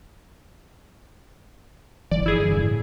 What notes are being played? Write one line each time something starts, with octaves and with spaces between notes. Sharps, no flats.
G1 E3 F3 D5
E4 G#4
G2 D3
E1 C#3
A2